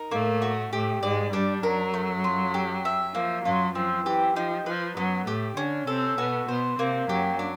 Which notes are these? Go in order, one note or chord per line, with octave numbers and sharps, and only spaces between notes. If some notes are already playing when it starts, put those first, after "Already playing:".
Already playing: D#4 A#4
A2 A3 A#3
F#4
A2 A3 G4
G#2 G#3 D5
G2 G3 D4
F#2 F#3 A#4
A3
F4
G4
E5
F3 A#3
F#2 F#3 F4
F3 C4
E3 G4
F3 D#4
F3 B4
F#2 F#3 B3
A2 A3 G4
D3 C#4 D4
C3 C4 A4
B2 B3 F#4
B2 B3 C5
C3 A#3 C4
F#2 F#3 G4
D4